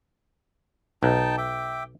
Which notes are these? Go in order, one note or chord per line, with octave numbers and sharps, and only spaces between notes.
B1 D#4 G5 A5
E5 G5 D6